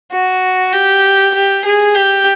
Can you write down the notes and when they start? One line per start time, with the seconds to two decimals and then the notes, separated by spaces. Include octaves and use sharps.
0.11 F#4
0.72 G4
1.34 G4
1.65 G#4
1.94 G4